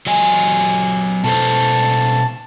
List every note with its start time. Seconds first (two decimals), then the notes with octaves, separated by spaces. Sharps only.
0.07 F#3 D#5 G#5
1.24 B2 A4 C5 A5